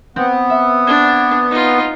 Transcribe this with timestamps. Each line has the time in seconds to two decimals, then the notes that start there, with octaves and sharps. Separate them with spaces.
0.16 B3 C4
0.50 E5
0.87 D4 G#6
1.50 D#4 F4